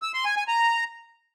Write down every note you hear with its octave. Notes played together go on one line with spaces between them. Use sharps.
E6
C6
G#5
G#5
A#5